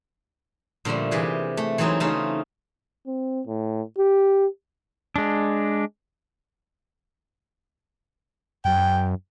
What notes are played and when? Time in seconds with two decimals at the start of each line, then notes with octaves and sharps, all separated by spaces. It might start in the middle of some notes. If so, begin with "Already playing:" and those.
0.85 A#2 D3 F3 G3 A3
1.11 C3 E3 G4 G#4 B4
1.57 A3
1.78 E3 F#3 G#3 C4 D#4
2.00 C#3 A3 C4 D#4 F4
3.07 C4
3.47 A2
3.98 G4
5.16 G#3 D4
8.65 F#2 G5